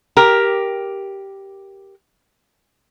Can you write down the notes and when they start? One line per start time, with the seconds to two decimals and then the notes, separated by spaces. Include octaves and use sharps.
0.17 G4 A#4